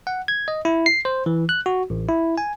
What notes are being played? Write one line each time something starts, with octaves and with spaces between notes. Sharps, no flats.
F#5
G#6
D#5
E4
C7
C5
E3
F#6
F#4
A1
E4
G#5